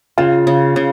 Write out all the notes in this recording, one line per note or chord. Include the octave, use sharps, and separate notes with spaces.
C#3 F4
C#3
C#3